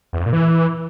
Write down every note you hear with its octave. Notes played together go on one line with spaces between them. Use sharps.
E2
F2
A#2
E3